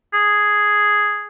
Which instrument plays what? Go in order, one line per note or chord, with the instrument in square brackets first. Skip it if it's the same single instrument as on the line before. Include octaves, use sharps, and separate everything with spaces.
[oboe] G#4